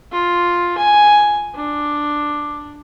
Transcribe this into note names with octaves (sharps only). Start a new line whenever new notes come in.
F4
G#5
D4